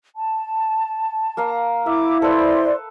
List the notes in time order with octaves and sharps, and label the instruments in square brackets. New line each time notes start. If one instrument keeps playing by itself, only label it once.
[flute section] A5
[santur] A#3 F5 A#5
[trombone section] E4 [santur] E5 [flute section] D6
[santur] A4 B4 [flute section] C5 D5 C6